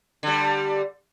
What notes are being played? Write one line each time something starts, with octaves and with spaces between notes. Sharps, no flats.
D3 G3